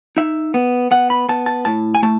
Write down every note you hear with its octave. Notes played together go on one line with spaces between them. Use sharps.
D#4 E5
B3
B3 F#5
B5
B3 A5
A5
A2 A5
G#5
A3 A5